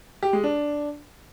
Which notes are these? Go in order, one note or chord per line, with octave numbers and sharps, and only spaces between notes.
G4
G#3
D4